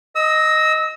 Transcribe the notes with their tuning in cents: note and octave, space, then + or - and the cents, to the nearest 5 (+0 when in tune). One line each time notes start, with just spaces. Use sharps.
D#5 +0 E6 -30